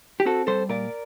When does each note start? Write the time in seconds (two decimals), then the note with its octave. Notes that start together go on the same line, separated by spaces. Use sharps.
0.20 G4
0.25 C4 F#4 A4
0.47 G3 A4 C5
0.69 A#2 A#4 D5